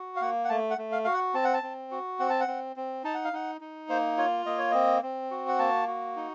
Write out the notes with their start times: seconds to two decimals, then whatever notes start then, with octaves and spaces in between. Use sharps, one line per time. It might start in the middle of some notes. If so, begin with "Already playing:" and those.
Already playing: F#4
0.16 F5
0.21 A#3 F#5
0.45 F#5
0.50 A3 A5
0.70 F#5
0.78 A3
0.92 F5
1.04 F#4 F5
1.13 F#5
1.34 C4 A5
1.45 F#5
1.54 A5
1.63 C4
1.91 F#4
2.19 C4 F#5
2.30 A5
2.40 F#5
2.48 C4
2.76 C4
3.04 D#4 A5
3.14 F#5
3.24 F5
3.33 D#4 F#5
3.61 D#4
3.89 A#3 C5
4.18 F4 C#5
4.46 A#3 D#5
4.58 C#5
4.71 C4 D#5
5.02 C4
5.31 F#4
5.48 F#5
5.59 A#3 A5
5.88 F#4
6.16 D#4